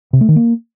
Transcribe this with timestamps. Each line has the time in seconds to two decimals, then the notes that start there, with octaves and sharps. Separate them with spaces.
0.13 C3
0.21 A3
0.28 D#3
0.36 A#3